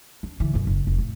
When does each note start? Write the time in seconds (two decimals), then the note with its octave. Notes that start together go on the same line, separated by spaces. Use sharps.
0.23 D4
0.40 D3 E3
0.53 B1 F#2
0.67 F#1
0.87 F1
0.98 A2